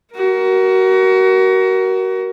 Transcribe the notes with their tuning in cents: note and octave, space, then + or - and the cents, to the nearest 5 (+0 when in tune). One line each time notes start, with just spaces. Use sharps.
F#4 +25 A#4 +15